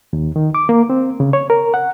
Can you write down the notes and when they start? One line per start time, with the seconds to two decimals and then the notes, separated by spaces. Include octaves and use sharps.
0.13 D#2
0.36 D#3
0.55 D6
0.69 A#3
0.90 C4
1.20 C#3
1.33 C#5
1.50 A#4
1.74 F#5